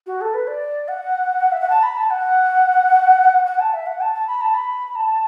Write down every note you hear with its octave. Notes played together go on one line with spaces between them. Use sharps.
F#4
A4
B4
D5
F#5
E5
F#5
A5
B5
A5
F#5
F#5
A5
E5
F#5
A5
A5
B5
A5
B5
A5